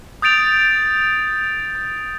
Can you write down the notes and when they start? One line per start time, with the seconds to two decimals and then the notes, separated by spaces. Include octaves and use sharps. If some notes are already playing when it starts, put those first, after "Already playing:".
0.22 D#6 G6 A6 D7 F7